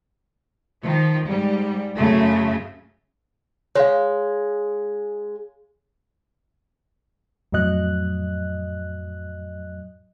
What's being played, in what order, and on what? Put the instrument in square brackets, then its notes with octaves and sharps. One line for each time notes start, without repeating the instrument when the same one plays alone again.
[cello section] D#3 F3
G#2 G3
F#2 C#3 A3
[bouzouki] G#3 [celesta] C#5 F5
[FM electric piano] F2 A2 F#3 D#5 F#6